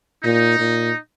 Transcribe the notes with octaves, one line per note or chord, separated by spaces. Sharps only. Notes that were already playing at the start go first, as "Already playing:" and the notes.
A#2 D#4
A#2